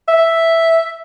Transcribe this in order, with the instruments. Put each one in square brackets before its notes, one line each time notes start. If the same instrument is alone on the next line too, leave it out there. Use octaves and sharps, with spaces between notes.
[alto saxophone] E5